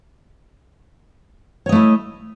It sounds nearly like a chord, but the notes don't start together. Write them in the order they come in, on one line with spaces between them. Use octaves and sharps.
C#5 D#5 A3 E4